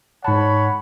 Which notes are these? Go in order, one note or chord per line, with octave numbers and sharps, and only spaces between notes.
G#2 C#5 F#5 A5 B5